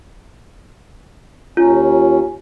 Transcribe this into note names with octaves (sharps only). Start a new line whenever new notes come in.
D#2 C#4 F4